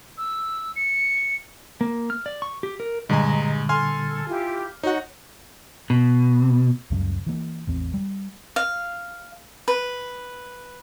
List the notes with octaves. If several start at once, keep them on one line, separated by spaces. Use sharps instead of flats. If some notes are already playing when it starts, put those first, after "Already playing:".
E6
C#7
A#3
F6
D5
C#6
G4
A#4
G2 A#2 D3 G3 G#3 D#5 G#5 A#5
A4 G#5 C6 F6
E4 F4 G4
D#4 F#4 C#5 F#5
B2
C#2 F#2 C#3 G3
E3 A#3
A1 E2 C4
G3
F5
B4